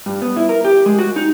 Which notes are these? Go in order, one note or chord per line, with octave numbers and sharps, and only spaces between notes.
G2
B3
E4
A#4
G4
G#3
F#4
D#4